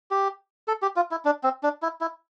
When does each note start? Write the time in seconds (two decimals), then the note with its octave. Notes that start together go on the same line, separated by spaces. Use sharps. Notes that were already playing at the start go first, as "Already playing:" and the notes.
0.11 G4
0.68 A4
0.82 G4
0.96 F4
1.11 E4
1.25 D4
1.43 C4
1.63 D4
1.82 E4
2.01 E4